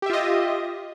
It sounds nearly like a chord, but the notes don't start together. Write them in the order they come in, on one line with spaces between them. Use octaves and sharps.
G4 E5 F4 D#5